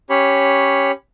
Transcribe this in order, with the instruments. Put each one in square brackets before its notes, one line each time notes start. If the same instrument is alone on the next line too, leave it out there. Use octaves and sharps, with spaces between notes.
[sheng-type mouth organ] C#4 G4 C#5 B5